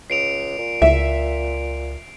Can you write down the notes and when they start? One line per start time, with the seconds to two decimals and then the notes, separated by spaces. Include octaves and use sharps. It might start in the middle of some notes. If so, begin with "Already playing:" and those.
0.10 C#2 C7 D7 F7
0.58 A#2
0.82 C#2 E5